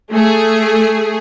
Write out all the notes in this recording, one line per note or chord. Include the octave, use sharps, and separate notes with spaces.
A3 G#4